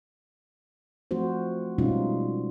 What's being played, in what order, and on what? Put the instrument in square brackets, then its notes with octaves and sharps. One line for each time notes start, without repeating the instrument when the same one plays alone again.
[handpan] F3 A3 C4 F#4 C5
B2 G3 G#3 C#4 D#4 F4